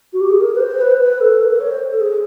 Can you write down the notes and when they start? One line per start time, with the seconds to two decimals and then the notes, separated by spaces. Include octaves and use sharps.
0.13 F#4
0.20 G4
0.30 G#4
0.41 A#4
0.55 B4
0.60 C5
0.80 B4
0.91 C5
1.00 B4
1.21 A4
1.40 A#4
1.51 A#4
1.60 C#5
1.70 C5
1.90 A4
2.00 G#4